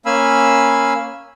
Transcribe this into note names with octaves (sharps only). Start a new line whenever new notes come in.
A#3 C#4 F5 G#5 B5 E6